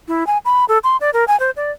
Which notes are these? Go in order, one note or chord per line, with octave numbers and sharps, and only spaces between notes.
E4
G#5
B5
A4
C6
D5
A#4
G#5
C5
D5